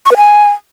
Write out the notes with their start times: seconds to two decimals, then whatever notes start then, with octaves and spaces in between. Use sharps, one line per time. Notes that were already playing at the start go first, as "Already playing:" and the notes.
0.06 C#6
0.11 B4
0.17 G#5